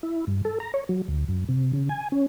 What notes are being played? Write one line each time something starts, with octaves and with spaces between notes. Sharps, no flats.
E4
G2
A4
A#5
C#5
F#3
D2
F#2
C3
C#3
G#5
C#4